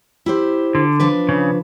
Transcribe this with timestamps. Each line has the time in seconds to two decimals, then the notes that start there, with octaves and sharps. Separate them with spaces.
0.26 E4 G4 C5
0.75 D3
1.00 F3 D4 B4
1.29 C#3